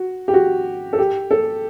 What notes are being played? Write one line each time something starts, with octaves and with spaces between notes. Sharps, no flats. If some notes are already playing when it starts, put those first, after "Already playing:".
Already playing: F#4
G4
F#4
A4
G4
A4